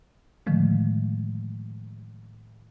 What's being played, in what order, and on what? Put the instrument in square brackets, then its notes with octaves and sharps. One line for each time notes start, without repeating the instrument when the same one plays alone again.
[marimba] A2 D3 D#3 F3 G#3 A3